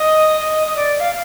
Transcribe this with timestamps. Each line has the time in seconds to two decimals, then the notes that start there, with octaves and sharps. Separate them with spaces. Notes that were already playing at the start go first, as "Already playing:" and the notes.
Already playing: D#5
0.40 D#5
0.67 D#5
0.76 D5
1.00 F5